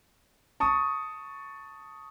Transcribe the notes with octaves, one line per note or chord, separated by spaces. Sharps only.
A5 C#6 D#6